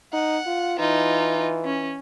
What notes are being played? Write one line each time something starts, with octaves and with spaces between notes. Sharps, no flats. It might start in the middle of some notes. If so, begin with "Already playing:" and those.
D#4 F#5
F4
E3 D#4 F4
C#4